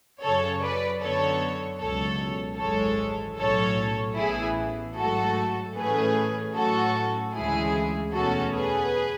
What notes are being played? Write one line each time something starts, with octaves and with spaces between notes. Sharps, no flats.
F#2 C#3 F#3 A4 C#5
B4 D5
F#2 D3 F#3 B3 A4 C#5
C#2 B2 F#3 A4 C#5
G#1 F#2 E3 G#3 A4 C#5
B1 A2 F#3 C#4 A4 C#5
A1 A2 E3 B3 E4 G#4
G#2 F#3 A3 F#4 A4
A2 E3 A3 C#4 G#4 B4
A2 F#3 A3 C#4 F#4 A4
D2 C#3 E3 G#3 E4 G#4
E2 B2 A3 C#4 F#4 A4
G#4 B4